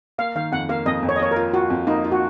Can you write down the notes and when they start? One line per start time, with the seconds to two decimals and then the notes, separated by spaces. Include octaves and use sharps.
0.18 A#3 F5
0.36 D#3 F5
0.52 F2 F#5
0.69 A#3 F5
0.86 F2 D#5
1.03 F2
1.09 C#5
1.16 D#5
1.20 A#3 C#5
1.31 F4 A#4
1.54 F4 F#4
1.70 F2
1.87 A#3 D#4
2.04 F4
2.12 F#4